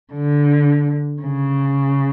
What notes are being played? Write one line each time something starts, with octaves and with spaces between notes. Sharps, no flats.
D3
C#3